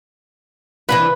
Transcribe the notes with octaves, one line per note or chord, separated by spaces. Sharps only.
G2 C3 E3 B4